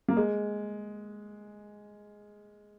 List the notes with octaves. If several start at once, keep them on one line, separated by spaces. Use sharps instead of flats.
A#3
G#3